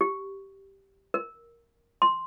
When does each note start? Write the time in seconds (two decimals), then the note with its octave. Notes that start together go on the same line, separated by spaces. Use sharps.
0.01 G4
1.14 A#4
2.02 C6